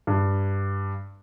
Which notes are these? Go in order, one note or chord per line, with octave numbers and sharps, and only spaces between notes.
G2